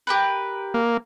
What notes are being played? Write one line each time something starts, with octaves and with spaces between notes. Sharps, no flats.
G4 A#4 B4
A#3